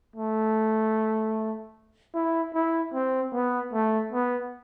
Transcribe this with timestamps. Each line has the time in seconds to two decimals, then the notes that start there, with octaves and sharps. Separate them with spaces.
0.16 A3
2.14 E4
2.54 E4
2.93 C4
3.33 B3
3.73 A3
4.12 B3